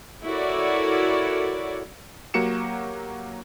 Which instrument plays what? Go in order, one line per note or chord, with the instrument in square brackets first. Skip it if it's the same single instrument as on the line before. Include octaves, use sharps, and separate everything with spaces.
[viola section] E4 F#4 A4 A#4 C#5 D5
[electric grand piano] F#3 A#3 F#4 G4 C#7 E7